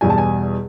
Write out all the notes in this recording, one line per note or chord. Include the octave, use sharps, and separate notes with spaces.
E2 B2 G3 G#5
A5
G#5